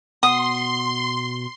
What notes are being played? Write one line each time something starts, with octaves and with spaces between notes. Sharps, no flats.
B2 F#5 C6 D#6